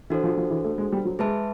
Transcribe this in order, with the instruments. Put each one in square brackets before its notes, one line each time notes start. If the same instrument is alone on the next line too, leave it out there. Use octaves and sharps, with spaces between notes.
[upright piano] E3 [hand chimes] D4 F#4 A4 C5
[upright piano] F3
F3
E3
A3
G#3
G3
F#3
[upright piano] G#3 [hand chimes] G#4 B4 E5 A5